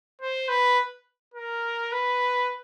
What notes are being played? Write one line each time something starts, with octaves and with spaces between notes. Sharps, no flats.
C5
B4
A#4
B4